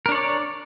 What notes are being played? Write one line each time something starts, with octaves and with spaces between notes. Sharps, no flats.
D4 A#4 C#5 D5